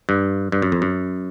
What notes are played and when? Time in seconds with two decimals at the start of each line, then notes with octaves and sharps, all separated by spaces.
0.09 G2
0.52 G2
0.62 F#2
0.72 F2
0.82 F#2